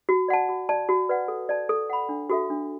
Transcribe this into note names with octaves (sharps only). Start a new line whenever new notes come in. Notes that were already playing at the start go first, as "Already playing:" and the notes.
F#4
D5 F#5 A5
F#4
D5 A5
F#4
B4 D5 F#5
A4
D5 A5
A4
F#5 B5
D4
F#4 A4 E5
D4